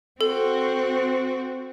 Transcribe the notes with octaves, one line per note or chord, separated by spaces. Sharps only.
C4 F#4 A4